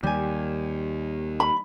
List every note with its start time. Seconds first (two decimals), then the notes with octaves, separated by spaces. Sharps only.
0.03 D#2 G3 G#5
1.40 B5